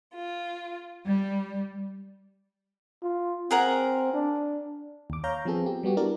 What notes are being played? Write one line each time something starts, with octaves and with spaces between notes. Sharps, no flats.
F4
G3
F4
C4 G#4 A#4 F#5
D4
D#2 D6
C#5 F5 A#5 G6
F3 B3 C4 G#4 A4
G4
G3 B3 F#4 G4
D4 E4 F#4 A#4 D5